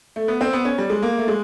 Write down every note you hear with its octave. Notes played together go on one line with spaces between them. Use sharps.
A3
B3
C4
B3
C#4
G3
G#3
A#3
A3
G#3